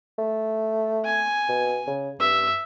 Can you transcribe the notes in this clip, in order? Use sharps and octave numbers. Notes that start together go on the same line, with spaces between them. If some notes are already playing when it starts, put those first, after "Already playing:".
A3
G#5
B2
C#3
G2 E5